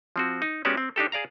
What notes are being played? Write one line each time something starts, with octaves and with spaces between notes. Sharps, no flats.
F3 C4 F#4
D#4
G#3 B3 C#4 F#4 G4 D5
C4
D4 D#4 G4 A4
G#4 D5 F5 A#5